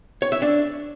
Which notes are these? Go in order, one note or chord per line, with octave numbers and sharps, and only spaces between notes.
C#5
E5
D4